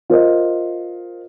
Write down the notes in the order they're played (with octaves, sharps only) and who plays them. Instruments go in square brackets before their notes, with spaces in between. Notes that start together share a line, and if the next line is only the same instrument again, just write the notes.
[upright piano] F4 A#4 C5 D#5